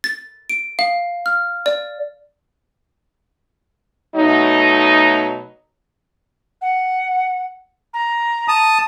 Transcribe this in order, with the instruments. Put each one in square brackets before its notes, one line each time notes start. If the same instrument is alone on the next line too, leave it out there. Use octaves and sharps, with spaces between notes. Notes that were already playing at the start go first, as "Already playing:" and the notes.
[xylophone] A6
D7
F5
F6
D5
[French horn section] B2 F#3 A3 D#4
[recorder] F#5
A#5
[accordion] A5 D#6